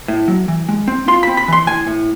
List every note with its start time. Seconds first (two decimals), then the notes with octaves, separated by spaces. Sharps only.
0.08 A2
0.28 F#3
0.48 E3
0.69 G#3
0.88 C4
1.08 F4 C6
1.23 C4 B5
1.37 B5
1.48 E3 C6
1.67 A2 G#5
1.87 A2